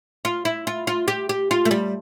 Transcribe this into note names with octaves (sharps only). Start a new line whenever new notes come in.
F4
E4
F4
F4
G4
G4
F4
A3
G3